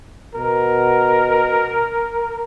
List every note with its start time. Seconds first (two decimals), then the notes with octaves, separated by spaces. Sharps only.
0.35 B2 A#4